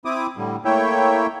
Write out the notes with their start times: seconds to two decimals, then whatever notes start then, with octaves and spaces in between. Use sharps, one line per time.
0.05 C4 E4 D6 D#6
0.37 A2 D3 G3
0.65 A3 A#3 E4 C#5 E5 G5